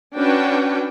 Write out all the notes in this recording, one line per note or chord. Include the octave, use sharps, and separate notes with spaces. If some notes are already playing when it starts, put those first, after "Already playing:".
C#4 D4 F#4 B4 G5